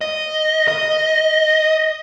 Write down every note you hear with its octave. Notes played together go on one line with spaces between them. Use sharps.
D#5
D#5